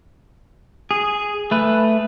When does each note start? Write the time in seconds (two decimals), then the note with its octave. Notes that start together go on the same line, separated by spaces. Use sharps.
0.91 G#4
1.51 A3 B4